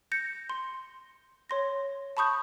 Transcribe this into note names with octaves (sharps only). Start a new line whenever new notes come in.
G6 A#6 C#7
C6
C#5 C6 A#6
A5 B5 C#6 D#6 G6